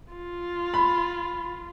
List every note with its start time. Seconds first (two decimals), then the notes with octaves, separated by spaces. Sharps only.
0.13 F4
0.74 B5